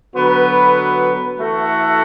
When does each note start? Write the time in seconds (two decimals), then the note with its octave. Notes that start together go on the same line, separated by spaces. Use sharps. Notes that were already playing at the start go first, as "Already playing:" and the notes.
0.15 D3 F#3 B3 F#4 B4
1.38 E3 A3 F#4 A4